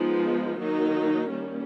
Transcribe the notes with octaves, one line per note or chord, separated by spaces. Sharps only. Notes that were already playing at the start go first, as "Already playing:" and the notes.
Already playing: F3 G#3 B3 D#4
D#3 F#3 A#3 D#4
D#3 G3 A#3 C#4